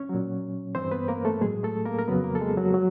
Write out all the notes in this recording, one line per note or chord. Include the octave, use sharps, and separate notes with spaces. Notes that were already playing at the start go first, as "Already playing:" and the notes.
Already playing: C#4 C#5
A#2 F#3
G2 E3 C4 C5
B3 B4
A#3 A#4
A3 A4
A2 F#3 G#3 G#4
A3 A4
A#3 A#4
A#4
F2 C#3 F#3 B3 B4
A#3 A#4
A4
G#3 G#4
F#3 F#4
F#3